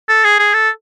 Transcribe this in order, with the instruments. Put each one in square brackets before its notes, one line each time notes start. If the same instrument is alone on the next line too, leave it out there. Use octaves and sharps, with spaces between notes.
[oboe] A4
G#4
G#4
A4